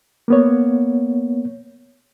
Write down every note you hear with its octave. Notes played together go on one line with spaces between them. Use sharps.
A#3 B3 C#5